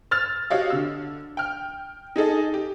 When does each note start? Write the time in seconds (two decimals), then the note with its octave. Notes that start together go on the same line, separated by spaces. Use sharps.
0.11 E6 F6 A6 F7
0.50 F#4 G4 C#5 D#5 F5
0.70 D3 E6
1.37 G5 F6
2.16 D#4 G#4 A4 D#5
2.54 G4